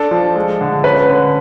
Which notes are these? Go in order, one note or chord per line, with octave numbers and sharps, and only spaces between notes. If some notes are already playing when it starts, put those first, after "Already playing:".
Already playing: D4 A4
F3
G#3
D3
C#4 B4
D3